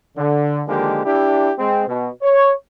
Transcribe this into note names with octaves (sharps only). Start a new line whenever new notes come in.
D3
D3 D#3 F3 G#3 A#3 G4
D4 E4 G4
G#3 C4
B2
C#5